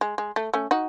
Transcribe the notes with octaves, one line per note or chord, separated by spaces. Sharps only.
G#3
G#3
A3
A3 C#4
D#4 F#4